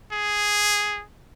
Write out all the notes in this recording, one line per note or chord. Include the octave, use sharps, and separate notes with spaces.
G#4